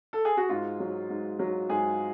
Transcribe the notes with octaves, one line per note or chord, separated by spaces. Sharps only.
A4
G#4
F#4
G#2 F4
F#3
G#2
F#3
G#2 G#4